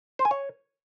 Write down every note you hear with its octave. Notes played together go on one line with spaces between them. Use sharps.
C5
G#5
C#5